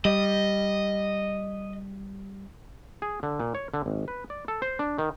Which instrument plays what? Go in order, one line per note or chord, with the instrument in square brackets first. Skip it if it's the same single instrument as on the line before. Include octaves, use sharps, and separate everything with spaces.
[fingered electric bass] G3 [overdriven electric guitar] D#5
[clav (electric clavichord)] G#4
D3
A#2
C#5
D3
G#1
B4
D5
A4
C5
D4
D#3